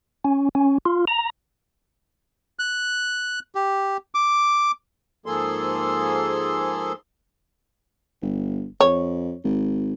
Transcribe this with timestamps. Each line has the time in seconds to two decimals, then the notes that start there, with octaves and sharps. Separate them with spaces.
0.24 C#4
0.55 C#4
0.85 F4
1.08 A#5
2.59 F#6
3.55 G4
4.15 D6
5.26 G#2 F3 A#3 G#4 A4 C6
8.22 G1
8.81 F2 C#5
9.44 G#1